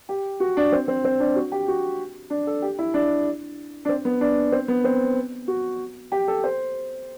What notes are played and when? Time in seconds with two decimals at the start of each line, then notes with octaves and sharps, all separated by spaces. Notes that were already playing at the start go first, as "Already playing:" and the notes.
0.09 G4
0.40 F#4
0.57 D4
0.72 C4
0.88 C4
1.04 C4
1.20 D4
1.36 F#4
1.52 G4
1.68 F#4
2.30 D4
2.47 A4
2.62 G4
2.79 E4
2.94 D4
3.85 D4
3.89 C4
4.05 B3
4.21 D4
4.52 C4
4.68 B3
4.84 C4
5.48 F#4
6.12 G4
6.28 A4
6.44 C5